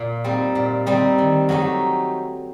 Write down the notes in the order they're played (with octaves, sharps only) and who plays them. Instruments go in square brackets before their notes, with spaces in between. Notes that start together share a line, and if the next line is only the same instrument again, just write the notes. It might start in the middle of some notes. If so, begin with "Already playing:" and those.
Already playing: [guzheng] A#2
G3 C4 D#4
A#2
G3 C4 D#4
D#3
F#3 A3 D#4 G4